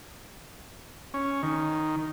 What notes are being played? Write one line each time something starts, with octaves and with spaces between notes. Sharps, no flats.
C#4
D#3